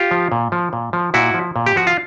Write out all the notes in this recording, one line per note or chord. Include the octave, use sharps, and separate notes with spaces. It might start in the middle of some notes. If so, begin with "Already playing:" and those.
Already playing: F4 G4
F3
A#2
F3
A#2
F3
A#2 E4 F#4
F3
A#2
G4
F3 F#4
F4